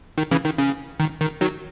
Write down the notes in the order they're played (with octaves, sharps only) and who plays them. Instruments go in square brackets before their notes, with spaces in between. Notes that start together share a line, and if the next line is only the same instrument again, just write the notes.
[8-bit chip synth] D#3
C#3 E3
D#3
C#3
D#3
D#3
D#3 F#3